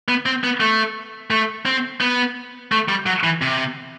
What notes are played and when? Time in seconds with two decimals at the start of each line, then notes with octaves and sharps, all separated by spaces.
0.08 B3
0.26 C4
0.44 B3
0.60 A3
1.30 A3
1.66 C4
2.01 B3
2.72 A3
2.88 G3
3.06 F#3
3.23 E3
3.42 C3